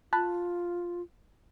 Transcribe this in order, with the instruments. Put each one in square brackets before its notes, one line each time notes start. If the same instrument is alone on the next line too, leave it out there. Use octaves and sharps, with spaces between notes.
[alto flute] F4 [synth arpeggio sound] A5 B5 F#6